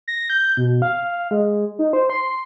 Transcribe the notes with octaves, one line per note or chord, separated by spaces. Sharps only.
A#6
G6
B2
F5
G#3
D#4
C5
C6